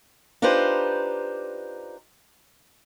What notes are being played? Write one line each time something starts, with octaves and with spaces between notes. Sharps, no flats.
D4 D#4 F4 G4 B4 C5